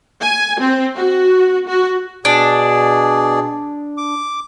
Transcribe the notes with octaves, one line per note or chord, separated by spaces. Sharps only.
G#5
C4
F#4
F#4
B2 D4 G#4 D5
D6